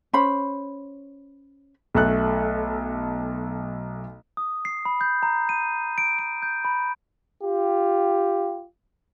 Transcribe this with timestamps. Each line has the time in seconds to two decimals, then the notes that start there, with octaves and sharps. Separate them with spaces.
0.13 C#4 C5 B5
1.94 B1 A3 A4 F#6
4.37 D#6
4.65 C7
4.85 B5
5.01 G6
5.23 A#5
5.49 D#7
5.98 D7
6.19 D7
6.42 G6
6.65 B5
7.42 F4 G4